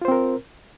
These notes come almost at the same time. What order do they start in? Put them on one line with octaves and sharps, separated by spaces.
F4 C5 C4 A#4